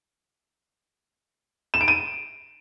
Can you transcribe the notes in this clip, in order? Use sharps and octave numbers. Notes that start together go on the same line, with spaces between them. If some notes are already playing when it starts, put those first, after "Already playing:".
E7
D7
D#7